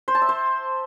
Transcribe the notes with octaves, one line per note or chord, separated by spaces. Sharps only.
C5
A5
E5
C5